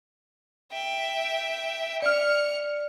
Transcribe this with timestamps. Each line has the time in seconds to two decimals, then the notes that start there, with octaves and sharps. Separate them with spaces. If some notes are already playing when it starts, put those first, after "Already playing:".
0.72 E5 G5
2.02 D5 F6 C#7 F7